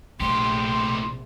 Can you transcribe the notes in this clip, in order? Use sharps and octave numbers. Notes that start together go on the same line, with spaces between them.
A#1 A2 C3 A3 D4 G4 C6